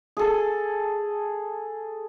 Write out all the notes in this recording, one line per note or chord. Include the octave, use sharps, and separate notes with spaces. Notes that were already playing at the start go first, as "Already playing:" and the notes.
G#4 A4